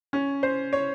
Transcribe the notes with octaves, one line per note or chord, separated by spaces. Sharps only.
C#4
C5
C#5